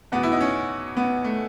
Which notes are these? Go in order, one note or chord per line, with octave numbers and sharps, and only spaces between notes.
E2 B2 B3
E4
D#4
C#4
B3
A3